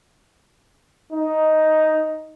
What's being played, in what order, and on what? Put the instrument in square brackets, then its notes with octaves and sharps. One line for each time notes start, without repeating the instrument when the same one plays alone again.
[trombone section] D#4